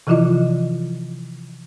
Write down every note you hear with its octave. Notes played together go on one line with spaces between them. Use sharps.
C3 E3 F3 E4 F4 D#5